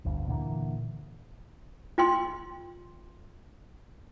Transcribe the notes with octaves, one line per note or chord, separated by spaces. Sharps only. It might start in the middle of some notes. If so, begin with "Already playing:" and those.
G1 D2 G2
A#2 D3 E3 A#3
F4 G5 C6